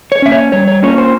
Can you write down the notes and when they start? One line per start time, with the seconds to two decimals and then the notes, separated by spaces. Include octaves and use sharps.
0.12 C#5
0.22 A#3 C#4 E5
0.32 C#5
0.52 G3 C#5
0.68 C#5
0.83 A#3 C#4 F4 C#5
0.98 C5